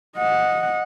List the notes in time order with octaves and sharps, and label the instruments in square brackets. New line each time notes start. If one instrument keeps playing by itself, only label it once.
[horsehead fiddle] D#5 F#5